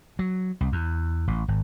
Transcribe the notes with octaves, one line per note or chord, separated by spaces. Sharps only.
F#3
C2
E2
A1
G#1